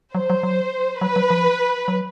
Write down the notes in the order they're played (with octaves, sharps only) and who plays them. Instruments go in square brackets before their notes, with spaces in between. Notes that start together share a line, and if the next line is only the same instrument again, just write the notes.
[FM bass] F#3 [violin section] C5
[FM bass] F#3
F#3
[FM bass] F#3 [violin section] B4
[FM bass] F#3
F3
F#3